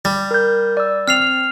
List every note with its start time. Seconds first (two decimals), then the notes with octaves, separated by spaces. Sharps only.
0.05 G3
0.31 A#4 G6
0.77 D5 E6
1.08 C4 F6 C7 F7